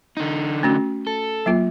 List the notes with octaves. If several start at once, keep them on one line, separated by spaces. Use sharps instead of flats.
D3 D#4
A3 C#4 F#4
A4
F#3 A#3 F4